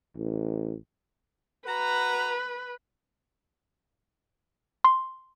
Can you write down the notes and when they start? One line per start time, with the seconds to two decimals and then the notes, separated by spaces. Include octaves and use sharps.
0.17 A1
1.67 F#4 B4 A#5
4.84 C6